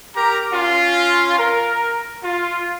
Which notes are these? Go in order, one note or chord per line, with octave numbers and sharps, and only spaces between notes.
G4 A#4 A#5
C#4 F4
A#4
F4